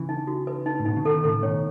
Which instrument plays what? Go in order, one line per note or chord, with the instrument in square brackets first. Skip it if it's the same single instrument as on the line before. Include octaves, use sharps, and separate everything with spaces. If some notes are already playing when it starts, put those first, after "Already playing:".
Already playing: [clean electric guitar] C#3 E3
[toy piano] D#4
F#4
B4
D#4
[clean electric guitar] A2
[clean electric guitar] B2 [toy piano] D#4
[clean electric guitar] C#3
[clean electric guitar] B2 D#3 [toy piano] A4
[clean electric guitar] A2 C#3 [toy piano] A4
[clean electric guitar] B2 D#3 [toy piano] C#5